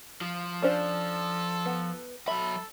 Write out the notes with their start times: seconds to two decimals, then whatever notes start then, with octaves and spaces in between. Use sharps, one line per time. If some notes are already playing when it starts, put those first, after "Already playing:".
0.21 F3
0.62 C#4 D4 A4 C5
1.65 B3
2.28 F#3 A4 E5 B5